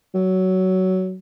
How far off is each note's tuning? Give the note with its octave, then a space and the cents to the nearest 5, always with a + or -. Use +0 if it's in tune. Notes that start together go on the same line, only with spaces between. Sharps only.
F#3 +15